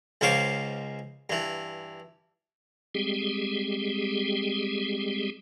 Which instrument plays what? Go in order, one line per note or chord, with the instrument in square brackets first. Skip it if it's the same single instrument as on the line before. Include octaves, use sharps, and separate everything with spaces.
[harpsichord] C#2 G#2 C#4 C5 F5 D6
G2 E3
[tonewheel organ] G3 G#3 C4 G4 G#4